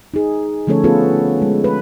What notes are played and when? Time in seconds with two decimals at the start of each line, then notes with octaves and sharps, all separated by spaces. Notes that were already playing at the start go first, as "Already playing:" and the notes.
0.14 D#4 G#4
0.67 D3 F3 A3 C#4 A4 C#5
0.84 B3 C#4 F4 G#4 A4 B4
1.42 G#3
1.64 B4